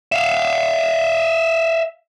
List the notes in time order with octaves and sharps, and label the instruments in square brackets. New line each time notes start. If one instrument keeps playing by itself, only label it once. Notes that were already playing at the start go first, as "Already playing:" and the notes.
[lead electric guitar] E5 F5